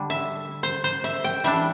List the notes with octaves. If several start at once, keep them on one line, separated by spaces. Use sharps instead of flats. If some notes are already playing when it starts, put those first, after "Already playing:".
Already playing: D3 G3 D4
E5
C5
C5
E5
G5
E3 G3 D4 E5